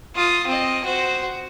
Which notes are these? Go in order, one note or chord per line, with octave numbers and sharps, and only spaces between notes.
F4 D#6
C4 D#5
F#4 C5